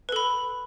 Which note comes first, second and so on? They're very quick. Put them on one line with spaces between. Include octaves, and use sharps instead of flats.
B4 A4 B5